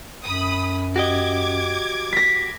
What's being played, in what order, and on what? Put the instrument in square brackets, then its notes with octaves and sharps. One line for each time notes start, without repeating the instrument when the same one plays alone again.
[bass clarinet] F#2 [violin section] B5 D#6
[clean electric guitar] F#4 G4 D#5 [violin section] D6 G#6
[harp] A#6 B6